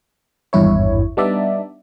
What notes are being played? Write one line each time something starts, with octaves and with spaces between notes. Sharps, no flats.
G#1 E2 G2 E4 C#5
G3 B3 D4 D#4 D5 E5